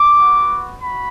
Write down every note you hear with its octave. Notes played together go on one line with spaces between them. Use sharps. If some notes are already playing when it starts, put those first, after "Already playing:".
Already playing: D6
B3 F#4
F#4 B5